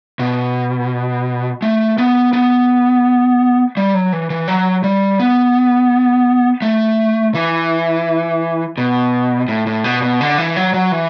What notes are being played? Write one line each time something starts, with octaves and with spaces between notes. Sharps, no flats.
B2
A3
B3
B3
G3
F#3
E3
E3
F#3
G3
B3
A3
E3
B2
A2
A2
B2
B2
D3
E3
F#3
F#3
E3